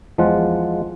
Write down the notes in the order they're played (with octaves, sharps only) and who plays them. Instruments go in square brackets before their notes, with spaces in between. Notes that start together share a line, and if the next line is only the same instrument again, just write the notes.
[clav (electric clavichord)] E2 F3 G#3 F4 F#5